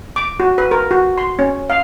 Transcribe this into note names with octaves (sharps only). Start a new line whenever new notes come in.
D6
F#4
B4
A#4
F#4
C6
C#4
F5